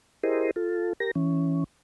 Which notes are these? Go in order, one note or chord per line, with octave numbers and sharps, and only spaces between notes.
E4 G4 G#4 A#4 C5 D#5
F4 A4
G4 A#4 A#6
E3 C#4